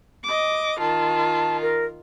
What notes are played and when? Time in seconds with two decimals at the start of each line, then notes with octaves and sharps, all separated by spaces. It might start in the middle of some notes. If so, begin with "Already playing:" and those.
0.24 D#5 D6
0.79 D#3 F4 A5
1.62 A#4